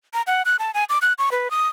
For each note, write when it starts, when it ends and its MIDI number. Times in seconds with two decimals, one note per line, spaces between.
0.14 0.22 82
0.27 0.42 78
0.45 0.56 90
0.59 0.71 81
0.74 0.84 80
0.89 0.98 86
1.02 1.13 90
1.18 1.30 85
1.32 1.51 71
1.51 1.68 87